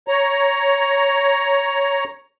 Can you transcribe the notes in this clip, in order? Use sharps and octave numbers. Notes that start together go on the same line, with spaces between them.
C#5 A#5